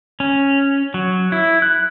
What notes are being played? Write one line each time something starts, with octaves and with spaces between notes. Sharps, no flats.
C#4
F#3
E4
F#6